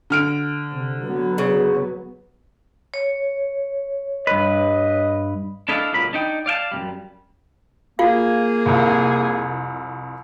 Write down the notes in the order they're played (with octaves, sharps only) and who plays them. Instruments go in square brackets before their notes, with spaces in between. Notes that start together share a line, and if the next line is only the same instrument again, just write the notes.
[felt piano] D3 F6 D7
[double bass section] C3
F#3 B3
[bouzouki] C#3
[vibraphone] C#5
[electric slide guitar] G2 B4 [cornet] D#5
[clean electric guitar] D4 E4 A4 D5 D#5 F5
C#2 A#2 F#3 A#3 B5
D4 D#4 G5
D5 F5 G5 A5
F#2 C3 G3
[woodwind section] A#3 G#4 [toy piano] F4 F5
[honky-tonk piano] C2 F2